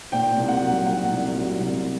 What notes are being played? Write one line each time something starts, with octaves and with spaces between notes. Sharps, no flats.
A#2 G5
C2
F#5
F#3
A#2 F#5
C2
F#3
C2